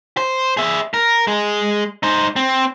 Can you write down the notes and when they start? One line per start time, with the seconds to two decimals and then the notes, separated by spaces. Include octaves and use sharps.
0.17 C5
0.57 G#4 E5
0.94 A#4
1.27 G#3 G#4
2.03 D#4 C5
2.36 C4